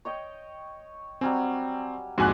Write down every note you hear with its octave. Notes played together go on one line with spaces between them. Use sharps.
C#5 D#5 G5
F#3 G3 C4 G#5
A#1 F2 G#2 F#4 G#5 C6 D6 F#6